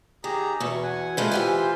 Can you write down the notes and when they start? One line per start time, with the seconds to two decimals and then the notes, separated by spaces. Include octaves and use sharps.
0.24 D#3 G4 G#4 A#5
0.60 E2 B2 C#6
0.83 F#5 G#5
1.17 A#2 G#3 A3 F4 B4 C5
1.31 E3 G4 G#5